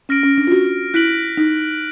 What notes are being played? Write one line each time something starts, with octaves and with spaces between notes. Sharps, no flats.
C#4 F6 A#6 D7
C#4
D4
F4
F#4
E4 F#6 B6 D7 F#7
D#4